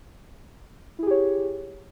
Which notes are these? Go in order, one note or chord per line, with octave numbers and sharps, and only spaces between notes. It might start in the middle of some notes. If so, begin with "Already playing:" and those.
E4 G4 G#4 C#5